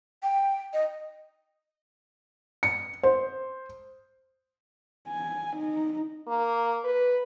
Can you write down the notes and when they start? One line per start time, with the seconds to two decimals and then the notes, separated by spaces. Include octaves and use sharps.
0.23 G5
0.73 D#5
2.63 C#7
3.03 C5
5.08 G#5
5.56 D#4
6.28 A#3
6.84 B4